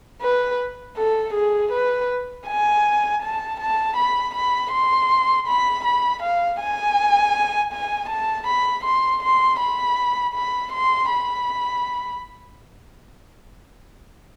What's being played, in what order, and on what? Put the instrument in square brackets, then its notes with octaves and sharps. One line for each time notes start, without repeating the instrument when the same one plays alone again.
[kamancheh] B4
A4
G#4
B4
G#5
A5
A5
B5
B5
C6
B5
B5
F5
G#5
G#5
A5
B5
C6
C6
B5
B5
C6
B5